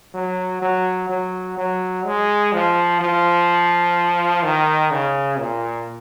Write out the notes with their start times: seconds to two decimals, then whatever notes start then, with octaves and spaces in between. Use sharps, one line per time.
0.14 F#3
0.62 F#3
1.10 F#3
1.58 F#3
2.05 G#3
2.53 F3
3.01 F3
4.43 D#3
4.91 C#3
5.39 A#2